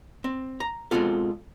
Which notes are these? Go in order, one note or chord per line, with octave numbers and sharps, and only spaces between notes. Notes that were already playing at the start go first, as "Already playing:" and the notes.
C4
A#5
B2 G#3 C4 F4 A4